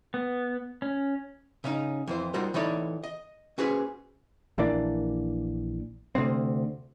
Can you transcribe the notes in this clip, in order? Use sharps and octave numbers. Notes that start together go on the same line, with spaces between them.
B3
C#4
C#3 C#4 D#4
F2 E3 C5
G3 D#4 F4 F#4 A#4 C5
E3 D#4 A4 C#5 D5 B5
D#5
C#4 F#4 G#4 B4 C5
A#1 E3 A#3 D4
D2 C3 B3 C4